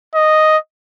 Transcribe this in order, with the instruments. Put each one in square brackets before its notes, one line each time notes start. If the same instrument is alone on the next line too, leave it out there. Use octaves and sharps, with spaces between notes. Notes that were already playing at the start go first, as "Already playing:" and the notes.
[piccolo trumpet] D#5